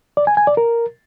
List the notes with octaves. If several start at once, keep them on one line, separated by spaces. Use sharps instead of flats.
D5
G#5
G#5
D5
A#4